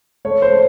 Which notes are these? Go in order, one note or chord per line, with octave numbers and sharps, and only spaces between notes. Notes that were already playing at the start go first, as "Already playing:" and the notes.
A3 C#5
C5
A3